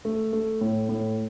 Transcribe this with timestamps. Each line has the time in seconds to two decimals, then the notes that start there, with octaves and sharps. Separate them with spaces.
0.05 A3
0.33 A3
0.61 A2
0.89 A2